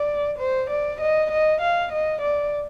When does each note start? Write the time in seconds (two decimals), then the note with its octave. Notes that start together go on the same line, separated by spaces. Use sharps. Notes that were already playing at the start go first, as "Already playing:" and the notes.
Already playing: D5
0.39 C5
0.70 D5
1.01 D#5
1.31 D#5
1.61 F5
1.92 D#5
2.21 D5